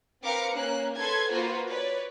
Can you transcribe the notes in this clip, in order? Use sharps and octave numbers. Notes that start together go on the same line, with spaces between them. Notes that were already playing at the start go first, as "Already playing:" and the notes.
C4 A#4 B4 F5 D6 C#7
A#3 C#4 F#6
A4 B4 C6 G#6
A#3 F4 F#4 B4 C5
B4 C#5 D5